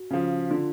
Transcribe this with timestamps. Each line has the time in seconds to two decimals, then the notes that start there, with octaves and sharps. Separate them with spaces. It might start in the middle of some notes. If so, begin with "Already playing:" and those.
Already playing: F#4
0.10 C#3 F3
0.51 D3 F4